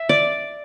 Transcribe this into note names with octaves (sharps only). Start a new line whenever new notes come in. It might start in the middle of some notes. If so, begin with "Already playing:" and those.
Already playing: E5
D5